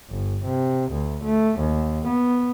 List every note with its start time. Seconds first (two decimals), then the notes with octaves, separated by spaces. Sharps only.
0.10 G1
0.45 C3
0.91 D2
1.24 A3
1.59 D#2
2.06 B3